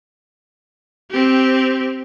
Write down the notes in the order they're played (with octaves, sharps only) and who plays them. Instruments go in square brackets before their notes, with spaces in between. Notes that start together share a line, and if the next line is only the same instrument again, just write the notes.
[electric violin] C4 G4